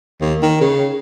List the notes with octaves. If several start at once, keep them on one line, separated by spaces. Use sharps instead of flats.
D#2
D#3
C#3